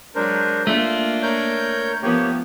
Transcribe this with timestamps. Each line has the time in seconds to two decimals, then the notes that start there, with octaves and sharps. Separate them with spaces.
0.15 F#3 G#3 D4 A#4 C5
0.67 A3 A#3 D4 F4
1.22 A#4 C#5 G6
2.03 F3 A#3 B3 G4 C#5